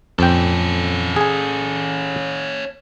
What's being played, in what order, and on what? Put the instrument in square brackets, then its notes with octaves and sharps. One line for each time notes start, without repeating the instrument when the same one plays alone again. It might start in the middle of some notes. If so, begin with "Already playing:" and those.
[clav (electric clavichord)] F2 G5 [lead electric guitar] C#4 A4
[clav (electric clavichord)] G#4 G#5